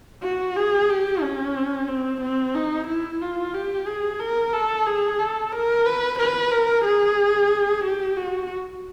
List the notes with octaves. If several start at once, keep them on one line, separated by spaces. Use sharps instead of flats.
F#4
G#4
G4
C#4
C4
C4
D#4
E4
F4
G4
G#4
A#4
A4
G#4
A4
A#4
B4
B4
A#4
G#4
G4
F#4